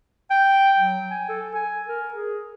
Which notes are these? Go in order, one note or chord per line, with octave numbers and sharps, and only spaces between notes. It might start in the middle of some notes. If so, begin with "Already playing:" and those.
G5
F#3
G#5
A4
G#5
A#4
G#4